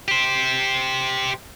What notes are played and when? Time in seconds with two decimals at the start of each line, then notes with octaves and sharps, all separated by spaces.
0.08 G4 C5